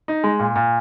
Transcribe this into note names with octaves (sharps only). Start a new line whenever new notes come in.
D#4
G#3
A#2
A#2